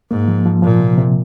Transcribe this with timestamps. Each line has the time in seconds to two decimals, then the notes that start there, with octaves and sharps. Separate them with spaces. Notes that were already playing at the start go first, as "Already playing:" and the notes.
0.11 G#2 A#3
0.28 F3
0.46 F3
0.62 A#2 F3
0.80 C3
0.98 C3